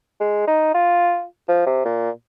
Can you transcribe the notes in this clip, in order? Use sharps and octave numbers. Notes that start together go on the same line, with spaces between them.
G#3
D#4
F4
F3
C3
A#2